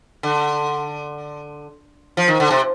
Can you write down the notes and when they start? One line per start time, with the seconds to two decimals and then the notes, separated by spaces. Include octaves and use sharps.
0.23 D3
2.17 F3
2.28 D#3
2.40 D3
2.51 C3